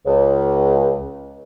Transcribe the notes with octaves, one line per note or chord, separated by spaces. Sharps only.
C#2